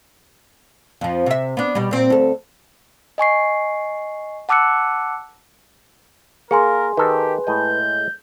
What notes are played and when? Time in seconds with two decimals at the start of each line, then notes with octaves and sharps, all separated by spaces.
1.01 F2 F3
1.26 C3 E5
1.57 B3 D4
1.75 B2 G3
1.91 A#2 C4
2.10 D2 A4
3.18 D#5 G#5 C#6 C7
4.49 F#5 A5 D6 E6 F#6 C#7
6.51 A#3 G#4 A#4 G#5 C6
6.97 D#3 G4 A4 B4
7.47 A2 G#3 D#5 G6